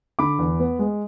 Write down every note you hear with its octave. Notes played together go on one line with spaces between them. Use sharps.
D3 B5 D6
E2
B3
G#3